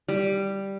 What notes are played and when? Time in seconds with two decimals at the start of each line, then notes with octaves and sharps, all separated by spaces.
0.08 G3